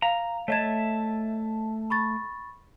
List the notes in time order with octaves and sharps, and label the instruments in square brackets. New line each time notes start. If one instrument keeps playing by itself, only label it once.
[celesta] F5 [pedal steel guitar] A#5
[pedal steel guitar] A3 E5 A5 [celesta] C#5 D#5 G#6
[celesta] B5 C#6 A6